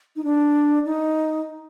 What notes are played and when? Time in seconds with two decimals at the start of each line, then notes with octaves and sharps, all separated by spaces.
0.16 D#4
0.24 D4
0.85 D#4